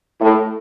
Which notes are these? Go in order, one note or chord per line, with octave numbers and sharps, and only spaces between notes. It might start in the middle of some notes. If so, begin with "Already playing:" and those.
A2